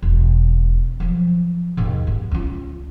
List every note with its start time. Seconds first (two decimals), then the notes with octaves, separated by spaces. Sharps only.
0.02 E1
1.00 F3 F#3
1.77 D#2 G#2
2.07 B3
2.31 C#2 F4